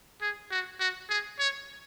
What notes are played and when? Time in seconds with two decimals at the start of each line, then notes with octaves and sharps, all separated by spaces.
0.21 G#4
0.51 F#4
0.80 F#4
1.10 G#4
1.39 C#5